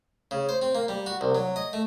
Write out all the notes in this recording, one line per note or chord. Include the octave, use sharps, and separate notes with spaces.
C#3
C5
C4
A#3
G3
F#4
C2
F#3
D#5
A3